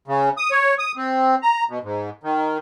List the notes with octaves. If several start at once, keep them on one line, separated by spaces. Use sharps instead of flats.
C#3
D#6
C#5
D#6
C4
A#5
B2
G#2
D#3